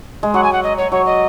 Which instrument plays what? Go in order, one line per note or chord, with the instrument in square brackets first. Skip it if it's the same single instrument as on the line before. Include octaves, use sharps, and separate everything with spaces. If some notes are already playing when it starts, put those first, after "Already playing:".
[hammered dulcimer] G#3
[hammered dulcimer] F#3 [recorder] F#5
[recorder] G#5
F#5
D#5
C#5
[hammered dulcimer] F#3 [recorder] C#5
[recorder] D#5